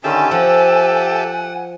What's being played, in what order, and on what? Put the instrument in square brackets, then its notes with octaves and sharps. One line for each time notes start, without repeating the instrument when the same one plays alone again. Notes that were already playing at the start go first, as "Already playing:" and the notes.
[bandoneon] D3 D#3 C#4 [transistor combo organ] G4 A4 E5 [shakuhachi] G#5
[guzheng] F3 [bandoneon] F#5